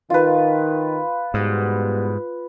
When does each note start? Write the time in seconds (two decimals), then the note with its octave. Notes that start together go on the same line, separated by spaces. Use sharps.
0.10 D#3 F4 B4
1.34 G#2 B2 G3 B3